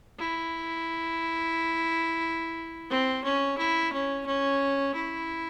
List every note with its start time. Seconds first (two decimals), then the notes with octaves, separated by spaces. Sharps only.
0.19 E4
2.90 C4
3.25 C#4
3.58 E4
3.93 C#4
4.26 C#4
4.95 E4